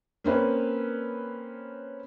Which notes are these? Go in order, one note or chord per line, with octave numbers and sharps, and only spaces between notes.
A#3 C4 C#4 B4